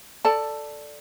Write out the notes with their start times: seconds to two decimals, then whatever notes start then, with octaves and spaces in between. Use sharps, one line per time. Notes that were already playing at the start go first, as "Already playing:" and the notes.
0.25 A4 D5 A5